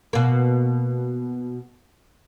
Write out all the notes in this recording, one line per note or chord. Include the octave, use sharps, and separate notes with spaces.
B2 A#3